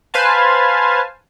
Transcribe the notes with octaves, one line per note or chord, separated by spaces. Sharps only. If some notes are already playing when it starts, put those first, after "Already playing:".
B4 C5 F5 G#5 A5